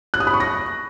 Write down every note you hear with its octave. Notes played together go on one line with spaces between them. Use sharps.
F#6
D#6
B5
C#6
A#6